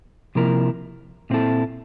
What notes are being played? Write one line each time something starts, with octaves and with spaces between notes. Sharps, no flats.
C3 F3 A#3 E4 A#4
A#2 A3 C4 E4 A4